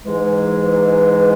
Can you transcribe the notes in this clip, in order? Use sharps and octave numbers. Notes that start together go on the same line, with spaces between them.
G#2 E3 G#3